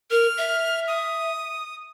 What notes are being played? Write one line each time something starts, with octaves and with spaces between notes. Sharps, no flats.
A#4 F6
E5
D#6